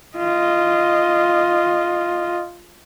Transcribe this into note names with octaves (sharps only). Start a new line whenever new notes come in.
F4 D#5